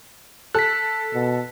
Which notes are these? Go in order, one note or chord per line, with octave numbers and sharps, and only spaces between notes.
A4 F#6 B6
B2